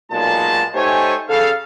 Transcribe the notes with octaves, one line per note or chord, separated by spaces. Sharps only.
B1 A#2 G#3 A5
A3 D#4 G4 C5 C#5 G#5
C#3 A4 F5